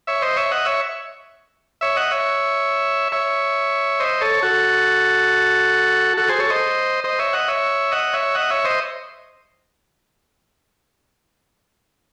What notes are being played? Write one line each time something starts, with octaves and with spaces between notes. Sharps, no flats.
C#5 E5
C5 D#5
C#5 E5
D#5 F#5
C#5 E5
C#5 E5
D#5 F#5
C#5 E5
C#5 E5
C5 D#5
A4 C#5
F#4 A4
F#4 A4
G#4 C5
A4 C#5
C5 D#5
C5 D#5
C#5 E5
D#5 F#5
C#5 E5
D#5 F#5
C#5 E5
D#5 F#5
C#5 E5
C5 D#5